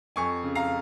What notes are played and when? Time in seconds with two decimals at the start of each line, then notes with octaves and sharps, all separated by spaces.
0.16 F2 G#5 C#6
0.43 C#3
0.55 F5 A#5